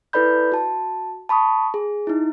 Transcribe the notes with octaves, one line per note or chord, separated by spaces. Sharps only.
E4 A4 B4 D5 B5 G6
F#4 A5
A5 B5 C#6 D#6
G#4
D#4 E4